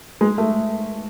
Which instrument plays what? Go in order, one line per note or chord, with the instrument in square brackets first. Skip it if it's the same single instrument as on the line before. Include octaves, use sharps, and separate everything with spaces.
[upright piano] G#3
A3